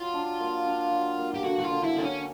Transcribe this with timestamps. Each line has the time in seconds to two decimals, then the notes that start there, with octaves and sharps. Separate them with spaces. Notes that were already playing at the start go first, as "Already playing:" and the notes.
Already playing: F#3 F4
0.14 D4
0.40 A#3
0.66 D4
0.91 F#3
1.19 A#3
1.34 G4
1.44 D3 F#4
1.58 F#4
1.64 F4
1.70 D3
1.83 E4
1.96 D3 C4
2.03 C#4